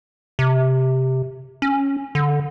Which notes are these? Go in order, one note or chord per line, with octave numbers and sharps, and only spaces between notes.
C3
C#4
D3